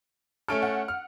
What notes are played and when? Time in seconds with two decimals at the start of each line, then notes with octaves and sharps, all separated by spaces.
0.48 A3 C#4 A4 F6 D7
0.62 F#5
0.88 F6